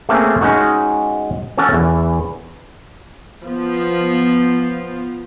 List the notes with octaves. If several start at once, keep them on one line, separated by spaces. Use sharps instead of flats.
A3 A#3 C4 C#4 G#4
G#3 C#4 D#4 F#4
C#4 F#4 A4 C#5
E2 E3
F3 B3 F4